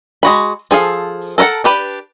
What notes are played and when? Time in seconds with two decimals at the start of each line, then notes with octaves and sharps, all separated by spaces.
0.23 G#3 F#4 B5
0.71 F3 G#4 A4 F5
1.38 A4 A#4 C#5 F#5 A5
1.64 D4 G4 B4